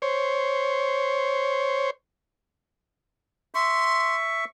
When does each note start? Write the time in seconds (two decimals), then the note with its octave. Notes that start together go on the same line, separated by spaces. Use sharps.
0.02 C5 C#5
3.54 E5 C6 C#6